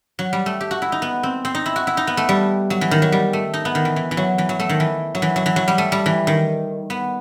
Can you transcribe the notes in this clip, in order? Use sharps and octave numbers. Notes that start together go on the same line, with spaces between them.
F#3
G3
A3
G4
F#4
E4
D#4
B3
C4
C4
D#4
E4
F#4
E4
D#4
B3
A3
G3
F#3
E3
D#3
F#3
G3
A3
D#4
B3
D#3
E3
E3
E3
F#3
E3
F#3
A3
D#3
E3
F#3
E3
F#3
E3
F#3
G3
A3
G3
E3
D#3
B3